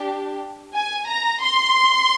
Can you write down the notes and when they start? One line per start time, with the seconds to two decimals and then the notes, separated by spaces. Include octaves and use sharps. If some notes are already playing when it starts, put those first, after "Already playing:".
Already playing: D4 G4
0.74 G#5
1.08 A#5
1.41 C6